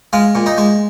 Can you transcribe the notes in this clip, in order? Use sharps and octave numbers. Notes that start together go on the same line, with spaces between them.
G#3 F4
A#2
D#4
G#3